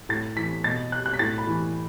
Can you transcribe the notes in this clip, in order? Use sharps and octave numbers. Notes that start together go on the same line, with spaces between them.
A2 A6
E3 B6
B2 A6
F#6
F#6
B6
A2 A6
B5
E3